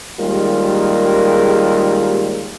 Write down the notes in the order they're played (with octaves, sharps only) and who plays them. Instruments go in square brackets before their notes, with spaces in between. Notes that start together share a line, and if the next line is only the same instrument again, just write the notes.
[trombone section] D#2 G3 G#3 F4 G#4 A#4